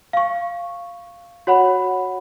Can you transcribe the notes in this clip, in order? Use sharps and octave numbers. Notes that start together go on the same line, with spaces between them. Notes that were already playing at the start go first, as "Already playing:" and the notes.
F5 C#6
F#4 C#5 F#5 B5